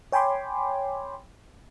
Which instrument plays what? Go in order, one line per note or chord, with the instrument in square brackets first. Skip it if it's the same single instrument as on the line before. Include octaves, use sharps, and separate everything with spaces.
[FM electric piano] C#5 G5 G#5 B5 C6 D6